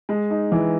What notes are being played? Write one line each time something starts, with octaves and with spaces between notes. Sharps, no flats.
G#3
D#4
E3